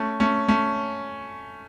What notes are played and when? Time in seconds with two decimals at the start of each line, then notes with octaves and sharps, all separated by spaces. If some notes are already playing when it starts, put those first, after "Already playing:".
Already playing: A3 C#4
0.20 A3 C#4
0.48 A3 C#4